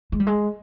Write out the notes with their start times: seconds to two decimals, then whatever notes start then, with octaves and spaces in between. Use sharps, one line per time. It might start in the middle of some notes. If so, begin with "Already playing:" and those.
0.12 G#3
0.20 G3
0.27 G#3